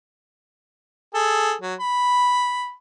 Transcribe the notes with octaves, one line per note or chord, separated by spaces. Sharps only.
G#4 A4
F#3
B5